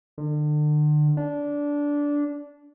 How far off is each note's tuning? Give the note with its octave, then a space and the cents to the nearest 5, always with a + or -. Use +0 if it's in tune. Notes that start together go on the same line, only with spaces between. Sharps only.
D3 +40
D4 -15